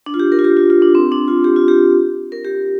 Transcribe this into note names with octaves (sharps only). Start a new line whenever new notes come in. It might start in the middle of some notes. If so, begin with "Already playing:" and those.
D4
F4
G4
A#4
F4
G4
F4
F4
D4
C4
D4
F4
G4
F4
G4
A#4
G4